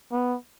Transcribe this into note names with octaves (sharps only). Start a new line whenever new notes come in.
B3